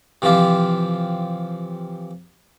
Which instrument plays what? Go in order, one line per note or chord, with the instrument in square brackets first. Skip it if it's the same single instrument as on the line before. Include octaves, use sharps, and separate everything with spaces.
[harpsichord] C3 E3 F3 F4 G4